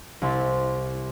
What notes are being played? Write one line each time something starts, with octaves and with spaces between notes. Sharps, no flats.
C2 E4 C6 A6